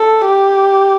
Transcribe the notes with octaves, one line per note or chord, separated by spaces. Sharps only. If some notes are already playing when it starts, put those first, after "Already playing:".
Already playing: A4
G4